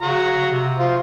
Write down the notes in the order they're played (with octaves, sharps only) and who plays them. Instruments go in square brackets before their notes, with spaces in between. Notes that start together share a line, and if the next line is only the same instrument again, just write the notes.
[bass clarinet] C#3 [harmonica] F#4 A#5
[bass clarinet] C3
[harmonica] F4 C5